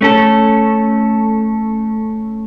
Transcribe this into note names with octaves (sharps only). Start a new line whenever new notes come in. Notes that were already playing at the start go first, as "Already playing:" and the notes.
A3 C#4 A4